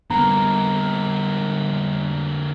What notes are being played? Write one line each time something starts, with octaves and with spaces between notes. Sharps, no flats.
D3 G3 A#3 B3 A#5